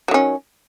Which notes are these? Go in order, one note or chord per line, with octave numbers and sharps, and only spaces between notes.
D#3 F#3 C#4